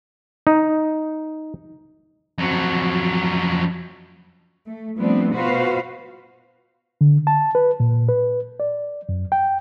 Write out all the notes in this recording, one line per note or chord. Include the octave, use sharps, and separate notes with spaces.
D#4
F2 F#3
A3
F3 G3 A3 B3 C4 D4
B2 F4 F#4 B4 C5 F5
D3
A5
B4
A#2
B4
D5
F#2
G5